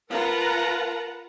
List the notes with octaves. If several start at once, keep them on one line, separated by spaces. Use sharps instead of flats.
F4 A#4 B4 F#5 A5 A#5